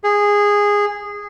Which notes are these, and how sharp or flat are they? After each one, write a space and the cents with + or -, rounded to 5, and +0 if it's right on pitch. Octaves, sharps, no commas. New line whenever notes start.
G#4 -15